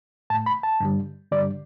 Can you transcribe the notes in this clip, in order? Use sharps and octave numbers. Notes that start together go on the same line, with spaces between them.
A2 A3 A5
B5
A5
G2 D3 G3
G2 D3 G3 D5